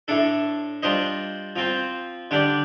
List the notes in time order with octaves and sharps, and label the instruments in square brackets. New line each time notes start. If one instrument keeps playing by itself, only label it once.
[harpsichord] A2 A3 D4 A4
G3 D4 F4 C5 D#5
F3 C4 F4 C5
D3 G3 D4 G4 D5